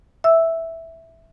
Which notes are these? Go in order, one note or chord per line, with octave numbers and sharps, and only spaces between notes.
E5 E6